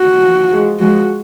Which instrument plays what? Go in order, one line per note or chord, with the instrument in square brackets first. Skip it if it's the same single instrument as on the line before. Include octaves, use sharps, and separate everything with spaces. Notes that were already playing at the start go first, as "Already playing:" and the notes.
Already playing: [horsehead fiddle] F#4
[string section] F3
F3 G#3
[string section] F3 G#3 [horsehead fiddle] F#4